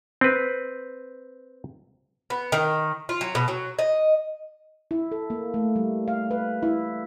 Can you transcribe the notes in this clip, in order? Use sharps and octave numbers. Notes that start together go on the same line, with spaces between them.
C4 B4
B3
D#3
F4
F#3
B2
F#3
D#5
E4
A4
A#3
A3
G3
F5
B4
E4